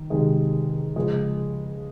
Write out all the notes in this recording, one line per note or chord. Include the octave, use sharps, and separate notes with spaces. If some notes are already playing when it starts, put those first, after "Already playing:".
Already playing: D#3
C3 D#3 G#3
C#3 F3 G#3